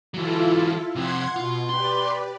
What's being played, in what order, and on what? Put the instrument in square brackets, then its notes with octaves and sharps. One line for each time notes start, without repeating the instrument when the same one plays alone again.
[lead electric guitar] E3 F#3 [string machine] E4 F4 A4
[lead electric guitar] C3 F3 [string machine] F#5 C6 G#6
[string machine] B2 [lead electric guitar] F4
[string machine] G4 B4 D5 [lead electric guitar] C6